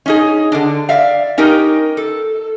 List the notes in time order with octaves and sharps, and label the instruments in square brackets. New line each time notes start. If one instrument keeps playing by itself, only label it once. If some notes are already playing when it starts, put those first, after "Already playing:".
[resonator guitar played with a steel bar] C#4 D#4 G#4
D3 D4
D5 E5 F5
C#4 D#4 G4 A#4
A4